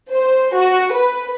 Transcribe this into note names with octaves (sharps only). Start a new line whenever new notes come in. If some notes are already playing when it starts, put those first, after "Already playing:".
C5
F#4
B4